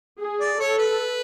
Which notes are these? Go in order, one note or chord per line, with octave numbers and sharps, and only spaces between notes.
G#4
D5
A4 C#5
B4